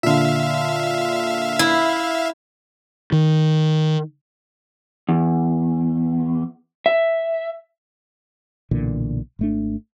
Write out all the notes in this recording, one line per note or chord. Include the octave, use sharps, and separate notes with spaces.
A#2 D3 E5 F5
E4
D#3
E2
E5
B1 A#2 D3 E3
G#1 A3 D4